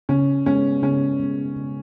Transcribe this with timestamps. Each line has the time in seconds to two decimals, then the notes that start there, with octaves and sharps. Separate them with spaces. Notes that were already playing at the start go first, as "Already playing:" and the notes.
0.09 C#3 C#4
0.46 G#3 B3 C#4
0.82 C#3 C#4
1.20 G#3 B3
1.56 C#3